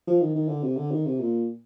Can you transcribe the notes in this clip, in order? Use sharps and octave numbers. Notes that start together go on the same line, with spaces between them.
F3
D#3
D#3
D3
C3
D3
D#3
C3
A#2